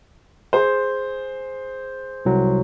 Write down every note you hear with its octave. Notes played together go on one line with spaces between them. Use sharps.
G#4 C5
C2 F#3